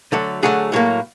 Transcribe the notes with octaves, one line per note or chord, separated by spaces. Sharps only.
D3 F#3 A3
D3 F#3 A3 G#4
A2 F#3 A#3